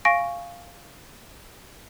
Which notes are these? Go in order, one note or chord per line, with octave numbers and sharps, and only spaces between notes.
F5 G#5 C#6 A#6 D7